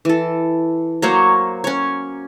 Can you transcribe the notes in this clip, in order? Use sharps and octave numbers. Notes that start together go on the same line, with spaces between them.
E3 A4
F#3 A#3 C5 C#5
C#4 C#5